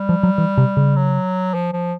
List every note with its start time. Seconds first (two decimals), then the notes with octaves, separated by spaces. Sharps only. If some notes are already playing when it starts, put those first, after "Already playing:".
Already playing: G3
0.09 F3
0.23 F#3
0.38 E3
0.57 C3
0.77 C#3
0.96 F#3
1.54 F3
1.73 F3